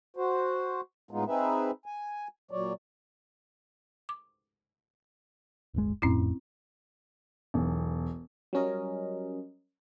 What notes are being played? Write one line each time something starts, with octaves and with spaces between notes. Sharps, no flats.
F#4 C5
A2 G#3 B3 D#4 F4
C4 D#4 G#4 B4 E5
G#5
A#2 F#3 C#5 D5
D6
D1 G1 G#3
G1 F2 A2 C4 C#4 E4
E1 B1
F#3 G3 C#4 A#4 D#5